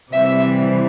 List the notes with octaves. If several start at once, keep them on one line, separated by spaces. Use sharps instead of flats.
C3 E3 G3 C4 E5